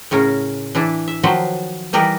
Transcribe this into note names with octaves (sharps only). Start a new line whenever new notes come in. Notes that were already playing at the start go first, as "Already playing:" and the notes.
A2 C#3 C#4 A#4
E3 D4 E4
E5
D#3 F3 F#3 F#4 B4 C5
E3 G3 D#4 A#4 B4